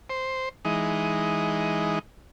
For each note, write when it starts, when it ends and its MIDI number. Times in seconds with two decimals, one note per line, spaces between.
0.10 0.49 72
0.65 1.99 52
0.65 1.99 56
0.65 1.99 63